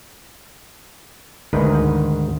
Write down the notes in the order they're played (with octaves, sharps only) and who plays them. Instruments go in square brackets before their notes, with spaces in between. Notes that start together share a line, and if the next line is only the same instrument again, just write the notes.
[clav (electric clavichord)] D2 G#2 D#3 B4